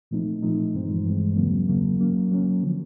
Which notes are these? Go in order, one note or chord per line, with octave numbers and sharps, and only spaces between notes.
A#2 F3 A3 C4 D#4
A#2 F3 A3 C4 D#4
G2 E3 G#3 C4
G2 E3 G#3 C4
E2 C#3 F#3 A#3
E2 C#3 F#3 A#3
F#3 A#3 C#4
F#3 A#3 C#4
D3 F3